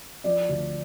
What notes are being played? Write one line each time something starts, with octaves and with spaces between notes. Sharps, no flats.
F3 D5
D2